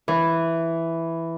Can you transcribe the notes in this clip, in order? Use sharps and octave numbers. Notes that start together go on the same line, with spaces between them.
E3